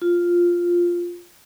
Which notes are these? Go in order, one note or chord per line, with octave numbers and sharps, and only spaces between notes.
F4